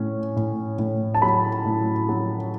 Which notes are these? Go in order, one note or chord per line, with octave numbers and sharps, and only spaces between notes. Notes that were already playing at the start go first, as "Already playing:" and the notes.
Already playing: A2 C#4
A2
A2
A5
F#3 B5
A2
F#3